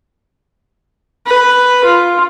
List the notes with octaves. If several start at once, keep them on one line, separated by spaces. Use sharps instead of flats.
B4
F4